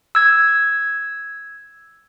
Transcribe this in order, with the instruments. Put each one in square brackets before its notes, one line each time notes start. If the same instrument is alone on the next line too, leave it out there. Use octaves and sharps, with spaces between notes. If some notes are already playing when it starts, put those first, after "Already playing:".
[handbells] E6 G#6